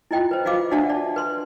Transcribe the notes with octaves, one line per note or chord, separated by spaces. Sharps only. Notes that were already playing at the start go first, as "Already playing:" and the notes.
E4 F4 D#5 G5
B4 C5
F4 F#4 D#5 F5 D6
D4 F#4 D5 E5 F#5 A5
D5
B4 C6